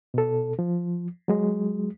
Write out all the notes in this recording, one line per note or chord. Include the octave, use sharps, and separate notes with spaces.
B2 A4
F3
F#3 G#3